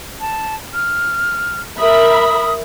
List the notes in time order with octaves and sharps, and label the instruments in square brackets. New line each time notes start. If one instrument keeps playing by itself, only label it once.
[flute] A5
F6
[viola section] A#4 E5 B5 [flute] D#6